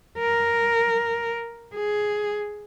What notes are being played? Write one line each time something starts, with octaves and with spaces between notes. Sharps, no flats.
A#4
G#4